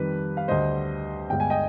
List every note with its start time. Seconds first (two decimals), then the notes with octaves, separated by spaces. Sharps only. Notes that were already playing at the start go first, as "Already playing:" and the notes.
Already playing: F2 D#3 G3 B4
0.37 F5
0.48 D2 D3 G3 C5 D#5
1.30 G1 G2 D3 G#3 G5
1.40 G#5
1.50 D#5 G5